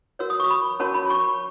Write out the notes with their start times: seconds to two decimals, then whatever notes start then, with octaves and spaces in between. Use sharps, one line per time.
0.19 F#4 A#4 C#5 E6
0.30 D#6
0.40 C#6
0.50 B5
0.80 C#4 F#4 A#4 C#5 A5
0.94 B5
1.10 C#6